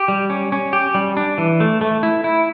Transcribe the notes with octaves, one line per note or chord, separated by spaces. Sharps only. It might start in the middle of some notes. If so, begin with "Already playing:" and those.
Already playing: G4
G3
C#4
C#4
G4
G3
D4
E3
A3
A3
E4
E4